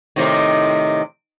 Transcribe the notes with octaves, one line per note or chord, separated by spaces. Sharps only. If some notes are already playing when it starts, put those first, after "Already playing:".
A2 C3 D#3